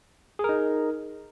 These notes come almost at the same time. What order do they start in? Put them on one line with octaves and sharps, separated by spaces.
G#4 A#4 D#4